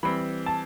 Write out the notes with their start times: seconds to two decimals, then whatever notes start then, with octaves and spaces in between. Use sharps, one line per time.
0.03 E3 G3 C4 B5
0.46 A5